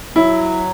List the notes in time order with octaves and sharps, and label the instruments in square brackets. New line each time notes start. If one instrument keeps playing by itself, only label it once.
[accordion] F#3 [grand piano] E4